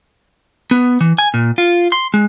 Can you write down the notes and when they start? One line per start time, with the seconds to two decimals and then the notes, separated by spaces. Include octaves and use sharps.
0.71 B3
1.01 E3
1.19 G#5
1.34 A#2
1.58 F4
1.92 C6
2.14 G#3